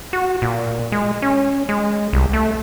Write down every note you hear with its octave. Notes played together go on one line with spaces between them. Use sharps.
F#4
A#2
G#3
C#4
G#3
C2
A3